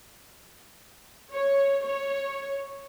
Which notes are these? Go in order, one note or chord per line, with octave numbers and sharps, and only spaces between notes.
C#5
C#5